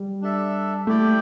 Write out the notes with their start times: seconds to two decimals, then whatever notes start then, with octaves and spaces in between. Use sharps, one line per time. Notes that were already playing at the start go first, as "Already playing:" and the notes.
Already playing: G3
0.22 D4 A4 E5
0.86 A3 E4 G4 D5 G5